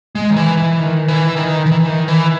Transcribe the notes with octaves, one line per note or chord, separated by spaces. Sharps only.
G#3
D#3
E3
E3
D#3
E3
D#3
E3
D#3
E3